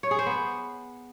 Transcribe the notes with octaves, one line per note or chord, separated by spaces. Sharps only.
C#5
G#4
C5
B3